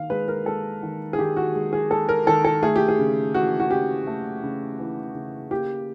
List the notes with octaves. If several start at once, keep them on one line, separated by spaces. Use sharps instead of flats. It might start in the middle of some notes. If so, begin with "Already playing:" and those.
Already playing: D#3 F5
G#3 B4
A#4
G#3 A4
D#3
G#4
D#3 G4
F#4
G#3
G#4
G#3 A4
A#4
D#3 A4
A4
A3 G#4
G4
G#4
C#3
E3 F#4
F#4
C#3 G4
A3
C#3
E3
C#3
A#3 G4